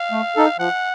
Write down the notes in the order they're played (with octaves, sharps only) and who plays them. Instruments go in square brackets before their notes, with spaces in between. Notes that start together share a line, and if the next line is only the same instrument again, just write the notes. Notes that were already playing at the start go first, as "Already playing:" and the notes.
Already playing: [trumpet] F5
[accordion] A3
D#4 A4
[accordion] F3 [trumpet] F#5